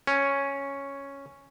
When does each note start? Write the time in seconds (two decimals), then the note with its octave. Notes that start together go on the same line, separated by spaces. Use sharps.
0.07 C#4